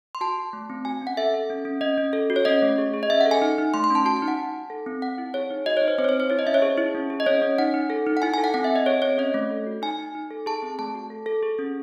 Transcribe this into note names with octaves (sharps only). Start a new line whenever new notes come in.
C6
F#4 A5
F#4
A3
C4
F#4 G#5
C#4
F#5
A4 E5
A4
C#4
C#4
C#4 D#5
C#4
A4
F#4
C#5
C#4 D#5
A3
G#4
G#4
D#5
C#4 E5
F#5
A4
G#5
D#4
D#4
A3 C6
C6
C#4 A5
F#4 A5
A5
D#4
F#5
D#4
D#4
A4
C4
C4 F#5
E4
G#4 C#5
D#4
F#4 D#5
C#5
D#4
C5
C4 C5
C#5
C5
D#4
C5
E4 C#5
D#5
C#4 E5
C#5
G#4
E4
C#4
G#4
D#5
C#4 C#5
C#4
D#4 F#5
D#4
A4
D#4
F#5
E4 G#5
G#5
A4
F#5
C4 F#5
E5
C4
D#5
G#4 C#5
C4 C#5
C#4 D#5
A3
A4
F#4
D#4 G#5
D#4
D#4
A4
G#4 A5
C4
A3 A5
F#4
A4
A4
G#4
C#4